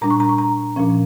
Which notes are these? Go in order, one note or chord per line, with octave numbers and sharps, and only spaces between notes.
A#2 G3 D4 A#5
C#6
A#5
C#6
A#5
A#2 F3 C#4